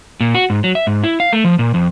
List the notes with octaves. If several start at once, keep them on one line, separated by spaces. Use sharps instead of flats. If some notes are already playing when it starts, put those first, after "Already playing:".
A#2
F#4
G#2
F#3
E5
G#2
E4
F5
A3
F3
A#2
F2